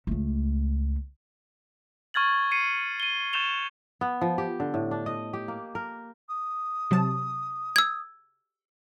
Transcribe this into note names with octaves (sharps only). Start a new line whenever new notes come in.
C#2 A3
C#6 F6 G#6 A6 F#7
C#6 C7 C#7 D#7
D#7 G7
C#6 G6 A6 E7 F7 G7
B3
F3
G4
D3
A2
D4
D#5
G4
A#3
A#4
D#6
C3 F#3 A5
E6 G#6